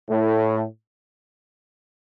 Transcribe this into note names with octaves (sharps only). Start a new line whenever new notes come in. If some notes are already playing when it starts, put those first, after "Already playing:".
A2